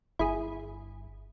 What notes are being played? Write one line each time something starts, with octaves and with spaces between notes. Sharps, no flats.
G1 E4 G#4